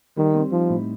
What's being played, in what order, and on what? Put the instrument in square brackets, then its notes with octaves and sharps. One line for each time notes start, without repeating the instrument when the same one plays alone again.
[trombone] D#3 [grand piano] G3
[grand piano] C4
[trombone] F3 [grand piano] D#4
[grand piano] A2